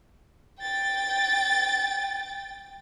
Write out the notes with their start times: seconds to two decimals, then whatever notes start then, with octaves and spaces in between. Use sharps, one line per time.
0.61 G5 A6